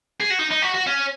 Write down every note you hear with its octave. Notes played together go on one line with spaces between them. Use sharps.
G#4
F#4
D#4
D#4
F#4
F#4
C#4